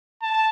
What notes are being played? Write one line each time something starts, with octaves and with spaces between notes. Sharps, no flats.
A5